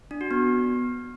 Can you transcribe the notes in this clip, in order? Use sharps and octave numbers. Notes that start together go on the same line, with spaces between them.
D4
F#4
B3